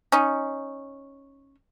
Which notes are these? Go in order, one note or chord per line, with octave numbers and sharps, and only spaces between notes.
C#4 D#4